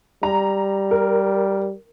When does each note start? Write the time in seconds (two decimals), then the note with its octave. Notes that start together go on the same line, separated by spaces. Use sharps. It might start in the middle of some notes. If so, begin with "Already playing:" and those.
0.23 G3 A#5
0.91 A#4